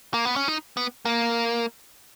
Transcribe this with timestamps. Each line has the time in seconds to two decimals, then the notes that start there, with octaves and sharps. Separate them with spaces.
0.14 A#3
0.25 B3
0.36 C#4
0.48 D#4
0.77 B3
1.05 A#3